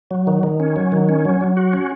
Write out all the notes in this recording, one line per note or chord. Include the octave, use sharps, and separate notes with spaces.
F#3
D#3
D#3
C#4
F#3
D#3
C#4
F#3
F#3
F#4
C#4